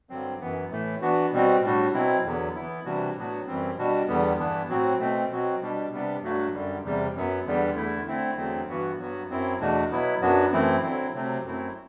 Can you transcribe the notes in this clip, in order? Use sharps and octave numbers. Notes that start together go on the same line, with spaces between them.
G2 D3 F#3 C4
F#2 E3 B3
A2 E3 A3
E3 B3 D4 F#4
B2 G3 C4 F#4
A2 G3 D4 F#4
B2 F#3 C4 E4
E2 D3 F#3 B3
E3 B3 E4
C3 E3 G3 D4 F#4
A2 F#3 B3 D4 F#4
F#2 E3 G3 C4
B2 G3 D4 F#4
E2 D3 G3 B3
G2 E3 B3 D4
A2 F#3 C4 F#4
B2 A3 C4
B2 F#3 C4 F#4
B2 G3 D4
C3 G3 B3 D4
G2 F#3 A3 D4 F#4
F#2 D3 G3
E2 C3 G3
F#2 F#3 B3
E2 D3 G3 B3
E2 D3 A3 E4
D3 A3 C4 E4
E2 D3 F#3 A3 C4
G2 E3 B3 F#4
G2 F#3 B3 F#4
F#2 F#3 C4 E4
E2 B2 A3 D4 F#4
B2 F#3 B3 E4
F#2 F#3 B3 D4 F#4
F#2 E3 A3 C4 E4
D3 F#3 C4 E4
C3 F#3 A3 C4
F#2 F#3 A3 C4 E4